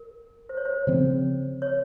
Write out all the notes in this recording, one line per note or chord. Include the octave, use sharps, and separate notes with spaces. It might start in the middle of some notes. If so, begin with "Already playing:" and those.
Already playing: A#4
C5
C#5
C5
C#3 F3 C4
C#5